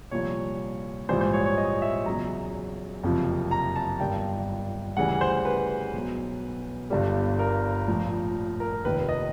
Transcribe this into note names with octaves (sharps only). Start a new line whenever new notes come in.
C2 A#2 F3 C#5
A#1 G#2 E3 G3 C5
C5
C#5
C#5
D#5
E5
E2 C#3 F#3 A#5
F#1 F2 C3 F3
A#5
A5
G1 G2 D#3 G3 G5
D2 C#3 E3 G3 F#5
C5
B4
B1 B2 F#3
G1 G2 D3 G3
A#4
A#1 A2 F3
A#4
F1 D#2 D#3 B4
D#5